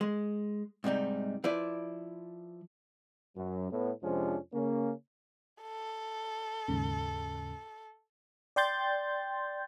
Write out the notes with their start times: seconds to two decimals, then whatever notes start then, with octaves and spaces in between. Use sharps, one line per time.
0.01 G#3
0.84 G#2 C3 G3 D#4
1.44 F3 E4 B4 D5
3.36 F#2 F#3
3.71 A2 B3
4.03 F2 C3 F3 G#3 C#4 D4
4.54 C#3 A#3 C#4
5.63 A4
6.68 D#2 G#2 C#3
8.56 D5 G5 C6 G6 A6